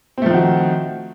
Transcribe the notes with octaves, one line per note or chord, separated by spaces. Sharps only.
D#3 F3 A3 C4 F#4